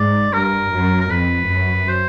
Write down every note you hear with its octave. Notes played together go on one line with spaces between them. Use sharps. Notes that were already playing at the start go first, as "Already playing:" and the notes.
Already playing: G#2 D5
G2 A#4
F#2
A#4
F2 B4
F#2
C5